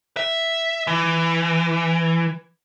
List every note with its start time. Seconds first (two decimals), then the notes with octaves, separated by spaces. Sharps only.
0.17 E5
0.87 E3